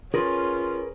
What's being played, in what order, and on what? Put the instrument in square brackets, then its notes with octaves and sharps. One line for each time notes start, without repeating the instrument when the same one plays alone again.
[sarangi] C#4 [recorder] F4 [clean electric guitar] G#4 A#4 B4